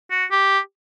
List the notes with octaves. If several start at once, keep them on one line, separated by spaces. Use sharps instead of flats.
F#4
G4